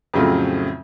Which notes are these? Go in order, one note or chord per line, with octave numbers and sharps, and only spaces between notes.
F2 A2 C#3 F#3 C4 F4